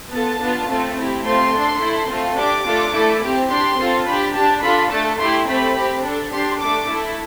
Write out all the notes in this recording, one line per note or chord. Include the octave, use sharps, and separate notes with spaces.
B3 F4 A4 A5
B3 D4 F4
A3 C4 F4 A4
C4 E4 G4
A3 C4 F4 C6
D4 A4
A3 E4 A4
A3 C4 F4 A4
D4 G4 D6
A3 D4 F4 A4
A3 E4 A4
C4 G4
D4 G4 C6
C4 F4 A4
D4 G4 B5
D4 G4 A5
D4 F4 A4 B5
A3 D4 A4 A5
A3 E4 G4 C6
A3 C4 G4 B5
C4 G4
D4 A4
D4 G4 C6
A3 D4 A4 D6
A3 E4 A4